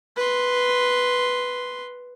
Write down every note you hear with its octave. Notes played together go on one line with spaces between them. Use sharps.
B4 C6